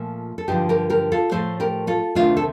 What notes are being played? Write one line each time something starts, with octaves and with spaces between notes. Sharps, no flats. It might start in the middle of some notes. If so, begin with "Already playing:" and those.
Already playing: A#2 F3 A3
A4
G2 D3 F3 D#4 G4
G4 A#4
G4 A#4
F4 A4
A2 F3 A3 A4 C5
G4 A#4
F4 A4
D2 C3 D#3 A3 D4 F4
A4